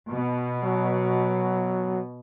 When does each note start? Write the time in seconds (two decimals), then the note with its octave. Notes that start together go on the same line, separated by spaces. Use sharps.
0.11 B2
0.64 F#3